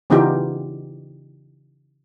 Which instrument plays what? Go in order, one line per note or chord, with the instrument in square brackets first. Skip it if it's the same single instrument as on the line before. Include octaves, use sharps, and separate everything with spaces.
[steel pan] C#3 E3 B3 D#4 F4 G4